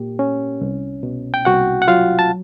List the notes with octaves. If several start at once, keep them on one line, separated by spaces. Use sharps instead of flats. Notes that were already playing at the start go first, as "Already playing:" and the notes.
Already playing: A#2 A#3 G4
C#4
C2
B2
G5
C2 F#4 F#5
F#5
F#3 F4 F5
A5